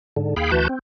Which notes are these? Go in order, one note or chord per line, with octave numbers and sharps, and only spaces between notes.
G#2 D3
D#2 G#4 F5 G5 B5
D2 E3 F#4 B4 A5 G6
C4